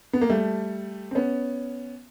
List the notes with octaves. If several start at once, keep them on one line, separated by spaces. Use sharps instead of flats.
B3
A#3
G3 A3
C4
B3 C#4